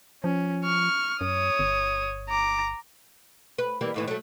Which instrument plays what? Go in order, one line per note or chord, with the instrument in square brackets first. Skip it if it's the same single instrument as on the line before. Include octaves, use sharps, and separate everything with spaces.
[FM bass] F3 [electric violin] C#4
[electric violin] C#6 F6
[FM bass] F#2 [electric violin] C#5 D#6
[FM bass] G1
[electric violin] A#5 D6
[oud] B4
E3 G3 A#3
D#2 A2 E3
F#3 A3